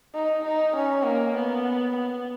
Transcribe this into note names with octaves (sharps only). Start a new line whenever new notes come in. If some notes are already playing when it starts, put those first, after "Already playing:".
D#4
D#4
C#4
A#3
B3
B3